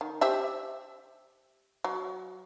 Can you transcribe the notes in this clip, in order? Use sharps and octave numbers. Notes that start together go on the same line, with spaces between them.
D#3
G4 C5 E5
F#3